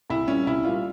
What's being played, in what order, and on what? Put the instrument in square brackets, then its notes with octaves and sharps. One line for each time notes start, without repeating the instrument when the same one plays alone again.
[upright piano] C2 E4
A#2 G3 C#4
C2 E4
A#2 G3 F4